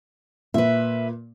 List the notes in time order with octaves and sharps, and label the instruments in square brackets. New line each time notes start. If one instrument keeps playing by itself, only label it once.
[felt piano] A#2 [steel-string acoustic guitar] B4 E5